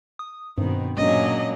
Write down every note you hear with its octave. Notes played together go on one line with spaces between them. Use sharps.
D#6
G2 B2 D#3 C4
A#2 F#3 G#3 A#3 C#4 D4 D#5